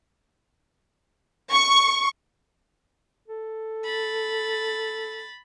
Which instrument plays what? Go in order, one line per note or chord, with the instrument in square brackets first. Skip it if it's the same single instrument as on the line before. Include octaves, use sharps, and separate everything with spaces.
[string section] C#6
[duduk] A4
[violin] B5 A6